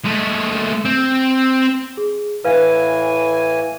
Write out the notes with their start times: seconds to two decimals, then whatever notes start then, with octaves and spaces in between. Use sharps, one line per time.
0.04 G#3 A3
0.85 C4
1.97 G#4
2.45 A2 E3 B4 F5 G#5